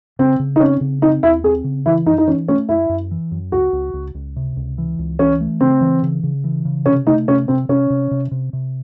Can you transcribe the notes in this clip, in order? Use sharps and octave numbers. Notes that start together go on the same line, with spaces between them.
C#3 C4
C#3
D#4
C4 C#4
C#3
C4 D#4
D#2 E4
C4 G#4
C#3
E3 E4
F#2 D#4
D#4
E3 C#4
A3 C#4
F#2 E4
F#2
E3
F#2
C#2 F#4
C#2
C#2
C#2
C3
C#2
E3
C#2
E3 C#4
A3
C#3 C4
E3
C#3
C#3
E3
C#3
C3 C#4
A3 D#4
C3 C#4
C3 C4
C3 C#4
C3
C3
C3
C3